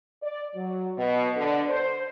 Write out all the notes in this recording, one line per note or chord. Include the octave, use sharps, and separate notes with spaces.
D5
F#3
B2
D3
C5